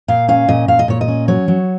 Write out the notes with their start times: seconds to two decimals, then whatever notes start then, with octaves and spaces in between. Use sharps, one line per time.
0.08 A#2 F5
0.28 C#4 F5
0.48 A#2 D#5
0.68 A#2 F5
0.79 D#5
0.88 A#2 C#5
1.01 D#5
1.08 C#4
1.28 F#3 C#5
1.48 F#3